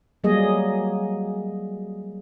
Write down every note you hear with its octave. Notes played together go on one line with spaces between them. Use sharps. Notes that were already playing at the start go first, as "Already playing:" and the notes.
F#3 G3 A#3 G#4 D#5